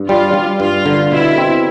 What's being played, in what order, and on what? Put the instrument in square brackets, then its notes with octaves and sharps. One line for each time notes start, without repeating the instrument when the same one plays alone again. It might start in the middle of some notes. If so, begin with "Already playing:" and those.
Already playing: [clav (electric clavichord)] G2
[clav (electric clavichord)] G3 [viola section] F4
[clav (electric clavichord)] G3
[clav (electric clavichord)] G2 [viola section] F4
[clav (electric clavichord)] D3
[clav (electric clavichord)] B2 [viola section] E4
[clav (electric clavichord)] C4